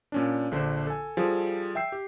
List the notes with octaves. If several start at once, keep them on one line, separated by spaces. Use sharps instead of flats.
A#2 C#4 D4
A#1 D3 C5
A4 G#5
F3 G3 G#4 A4
E5 G5 E6 C7
G4